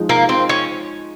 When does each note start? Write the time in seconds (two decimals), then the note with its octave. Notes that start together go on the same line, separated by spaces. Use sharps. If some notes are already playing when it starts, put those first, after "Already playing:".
Already playing: F3 G#3 D#4
0.09 A#3
0.29 C4
0.49 C#4